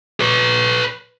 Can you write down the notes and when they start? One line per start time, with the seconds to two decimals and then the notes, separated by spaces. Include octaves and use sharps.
0.20 B4 C#5